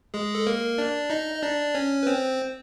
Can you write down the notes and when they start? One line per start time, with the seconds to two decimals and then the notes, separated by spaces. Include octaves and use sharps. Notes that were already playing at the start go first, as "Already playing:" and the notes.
0.14 G#3 G#4
0.35 A4
0.47 A#3 A#4
0.78 D4 D5
1.10 D#4 D#5
1.34 D#5
1.43 D4 D5
1.74 C#4 C#5
2.03 B4
2.07 C4 C5